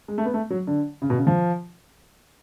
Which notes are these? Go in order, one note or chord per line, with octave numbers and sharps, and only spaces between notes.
G#3
A3
B3
A3
F#3
D3
C#3
B2
C#3
F3